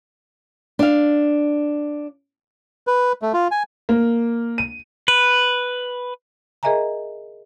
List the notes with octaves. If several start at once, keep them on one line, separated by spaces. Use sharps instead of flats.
D4 F5
B4
A3
F4
G#5
A#3
D#7
B4
G#4 A#4 D#5 E5 G#5 A#5